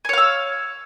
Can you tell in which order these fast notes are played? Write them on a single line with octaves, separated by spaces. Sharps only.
G#5 C#5 F5 E6